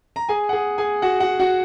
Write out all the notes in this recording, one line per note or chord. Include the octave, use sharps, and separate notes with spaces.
A#5
G#4 G#5
F#5
G#4 G#5
G#4 G#5
F#4 F#5
F#4 F#5
F#4 F#5